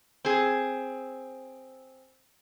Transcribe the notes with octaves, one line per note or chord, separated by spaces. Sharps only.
C4 G#4